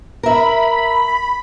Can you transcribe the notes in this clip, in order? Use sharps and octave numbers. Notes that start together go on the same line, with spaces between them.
A#4 E5 B5